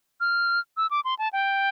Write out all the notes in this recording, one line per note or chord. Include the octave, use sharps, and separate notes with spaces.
F6
E6
D6
C6
A5
G5